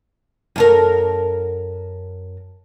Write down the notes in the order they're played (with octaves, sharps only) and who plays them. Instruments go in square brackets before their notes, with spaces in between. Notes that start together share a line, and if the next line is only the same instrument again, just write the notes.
[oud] F#2 A4 A#4